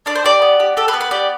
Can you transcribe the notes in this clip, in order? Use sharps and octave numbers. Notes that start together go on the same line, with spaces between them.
D4 D5
C5
G4 D5
B3
G4
G4 A4
B4
B3
B4
G4 D5